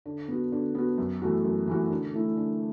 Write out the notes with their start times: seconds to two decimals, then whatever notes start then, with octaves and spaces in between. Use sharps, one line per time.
0.06 D3
0.28 B3 F#4
0.52 D3
0.75 B3 F#4
0.98 F#2
1.22 E3 A3 F#4
1.45 F#2
1.67 E3 A3 F#4
1.90 D3
2.14 A3 E4
2.37 D3